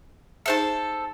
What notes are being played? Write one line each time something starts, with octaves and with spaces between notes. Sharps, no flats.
D#4 G#4 A4 C5 E5 A5